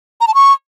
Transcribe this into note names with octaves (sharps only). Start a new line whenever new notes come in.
A#5
A5
C#6